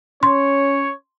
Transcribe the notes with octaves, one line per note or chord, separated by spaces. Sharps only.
C#4 C#5 C6